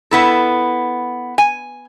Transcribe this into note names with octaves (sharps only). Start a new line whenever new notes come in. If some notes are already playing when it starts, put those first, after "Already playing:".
B3 E4 A4
G#5